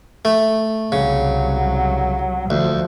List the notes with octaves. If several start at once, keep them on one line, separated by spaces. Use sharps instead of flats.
A3
C2 C#3 F#3
D2 F3